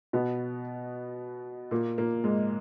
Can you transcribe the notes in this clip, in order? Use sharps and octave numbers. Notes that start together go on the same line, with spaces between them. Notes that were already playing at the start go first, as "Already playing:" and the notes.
B2 B3
A#2 A#3
A#2 A#3
G#2 G#3